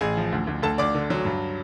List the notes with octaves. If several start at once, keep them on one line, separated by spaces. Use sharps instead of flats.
A1 G#4 G#5
F3
D2
D2
D2 A4 A5
D2 D5 D6
D3
F#3
G2